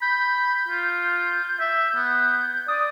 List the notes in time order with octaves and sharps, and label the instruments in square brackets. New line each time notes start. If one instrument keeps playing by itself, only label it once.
[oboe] B5 [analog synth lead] G6
[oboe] F4
E5
B3
[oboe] D5 [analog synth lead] D#6